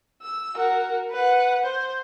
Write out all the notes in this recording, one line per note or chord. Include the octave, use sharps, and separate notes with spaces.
E6
F#4 A#4
B4 F#5
C5